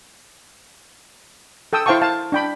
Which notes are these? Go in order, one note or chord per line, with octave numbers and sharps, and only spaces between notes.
A4 G5 D#6 E6
E4 C5 F5 G5 A5 C#6
F5 A5
D4 G5 B5